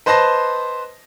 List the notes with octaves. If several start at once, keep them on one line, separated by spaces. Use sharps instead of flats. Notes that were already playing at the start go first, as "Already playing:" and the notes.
B4 C5 D#5 A5 C6 A#6